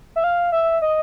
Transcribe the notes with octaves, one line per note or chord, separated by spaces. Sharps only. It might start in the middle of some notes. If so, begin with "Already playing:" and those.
E5
F5
E5
D#5